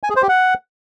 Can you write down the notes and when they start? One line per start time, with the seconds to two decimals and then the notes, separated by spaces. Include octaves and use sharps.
0.03 G#5
0.10 G#4
0.16 C5
0.22 G4
0.29 F#5